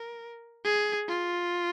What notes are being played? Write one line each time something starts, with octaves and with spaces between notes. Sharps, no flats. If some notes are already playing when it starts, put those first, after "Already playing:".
Already playing: A#4
G#4
F4